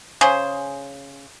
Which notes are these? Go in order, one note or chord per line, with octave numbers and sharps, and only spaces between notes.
C#3 G#4 C5